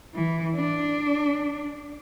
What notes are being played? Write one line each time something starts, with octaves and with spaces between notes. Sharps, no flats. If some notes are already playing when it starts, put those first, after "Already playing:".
E3
D4